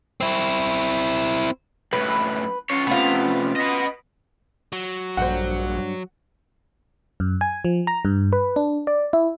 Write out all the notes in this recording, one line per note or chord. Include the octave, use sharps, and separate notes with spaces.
C4 E4
F#2 A2 B4
C#4 F4 C#5
C3 A3 B3 F4
B4 D#5
F#3
A#1 G2 C5 F#5
F#2
G#5
F3
A#5
G2
B4
D4
D5
E4